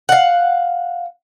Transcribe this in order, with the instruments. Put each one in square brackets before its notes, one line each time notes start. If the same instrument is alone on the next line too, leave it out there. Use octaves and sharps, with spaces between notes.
[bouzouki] F5 F#5